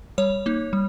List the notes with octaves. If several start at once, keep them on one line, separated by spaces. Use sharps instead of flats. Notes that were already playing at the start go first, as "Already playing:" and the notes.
G3 C#5
A#3 D#4
G3